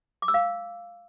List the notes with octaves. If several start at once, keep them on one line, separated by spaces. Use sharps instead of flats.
D6
E6
F5